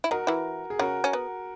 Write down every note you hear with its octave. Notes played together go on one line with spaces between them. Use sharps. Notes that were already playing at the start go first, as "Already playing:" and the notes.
E4
D#3 D#4 F#4 A#4
E3 E4
G#4
C#3 C#4 F#4 A#4
C#4
B3